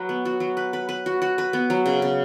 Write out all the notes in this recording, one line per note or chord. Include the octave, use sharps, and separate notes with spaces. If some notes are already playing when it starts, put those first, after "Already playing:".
Already playing: F#3 B4
B3
F#4
F#3
B4
B4
B4
F#4
F#4
B4
B3
F#3
C#3
C#3